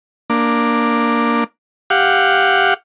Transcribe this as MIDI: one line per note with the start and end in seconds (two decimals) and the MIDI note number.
0.30 1.44 58
0.30 1.44 62
1.90 2.74 67
1.90 2.74 77
1.90 2.74 78